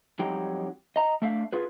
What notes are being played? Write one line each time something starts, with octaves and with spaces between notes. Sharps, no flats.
F2 F#3 G3 D#4 G4 G5
D#5 A#5
A3 D4 E5 F5
F4 G#4 B4